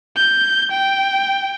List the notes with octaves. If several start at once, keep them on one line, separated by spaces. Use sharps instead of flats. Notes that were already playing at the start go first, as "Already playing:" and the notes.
G6
G5